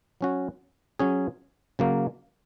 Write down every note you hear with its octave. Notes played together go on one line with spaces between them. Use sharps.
F#3 C#4 F#4
F#3 C#4 G#4
C#3 F#3 A#3